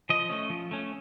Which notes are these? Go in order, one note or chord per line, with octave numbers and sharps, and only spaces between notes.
F3 D#5
A3 C#4
F3
A3 C#4